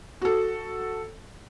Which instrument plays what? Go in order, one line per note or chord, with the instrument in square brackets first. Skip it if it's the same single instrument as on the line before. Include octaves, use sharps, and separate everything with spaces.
[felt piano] F#4 A4